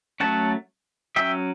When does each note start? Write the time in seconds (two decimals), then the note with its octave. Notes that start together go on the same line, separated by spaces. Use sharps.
0.20 F#3 A3 C#4 F#5 A5
1.16 F#3 C#4 E5 G5